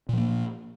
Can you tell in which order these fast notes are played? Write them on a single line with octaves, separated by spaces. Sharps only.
A#2 F3 A#3